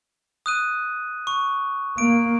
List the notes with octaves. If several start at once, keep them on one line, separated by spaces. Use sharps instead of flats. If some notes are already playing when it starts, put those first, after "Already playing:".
D#6 F#6 D#7
C#6
A#3 D7